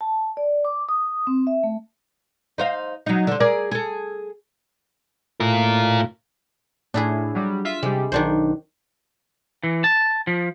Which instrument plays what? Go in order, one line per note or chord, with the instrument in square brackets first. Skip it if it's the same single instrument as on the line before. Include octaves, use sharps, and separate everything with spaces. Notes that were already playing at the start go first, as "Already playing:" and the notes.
[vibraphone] A5
D5
D6
D#6
C4
E5
A3
[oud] D#4 C5 F5
F#3 D#4
D3 C4
G#4 A#4 D5
G#4 A4
[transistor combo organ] A2 [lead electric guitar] F4 A#4
[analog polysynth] A2 [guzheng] D4 E4 G#4
[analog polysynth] F#3 G3
F4 E5 B6
[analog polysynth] C3 G3 [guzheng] G#3
[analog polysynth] B1 [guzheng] D#3 D4 C5
[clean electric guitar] E3
A5
F3